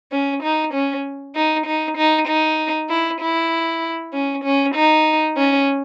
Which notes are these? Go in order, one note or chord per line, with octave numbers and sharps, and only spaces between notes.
C#4
D#4
C#4
D#4
D#4
D#4
D#4
E4
E4
C#4
C#4
D#4
C#4